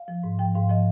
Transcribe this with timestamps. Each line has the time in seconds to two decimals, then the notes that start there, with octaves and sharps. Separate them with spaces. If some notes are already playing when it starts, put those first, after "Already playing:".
Already playing: F5
0.08 F3
0.23 G#2
0.39 F3 G5
0.55 G#2 F5
0.70 F3 D#5